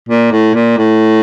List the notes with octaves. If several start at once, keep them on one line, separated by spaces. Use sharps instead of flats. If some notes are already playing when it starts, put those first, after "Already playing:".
A#2
A2
A#2
A2